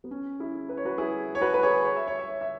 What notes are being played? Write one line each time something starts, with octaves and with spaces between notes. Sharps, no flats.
B3
C#4
E4 G#4
B4
C#5
F#4 B4
E4 G#4
C#5
F#4 B4
B4
G#4 C#5
C#5
E5
C#5
E5
C#5
E5